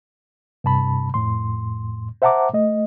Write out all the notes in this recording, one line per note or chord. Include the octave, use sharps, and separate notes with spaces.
G2 C3 A5 B5
F2 A2 C6
C5 E5 F#5 A5 A#5 D6
A3 D#5